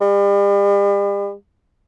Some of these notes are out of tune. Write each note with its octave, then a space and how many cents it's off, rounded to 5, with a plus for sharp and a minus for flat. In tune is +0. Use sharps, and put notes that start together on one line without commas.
G3 +40